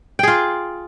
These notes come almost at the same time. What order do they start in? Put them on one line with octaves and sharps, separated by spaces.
G5 G#4 F4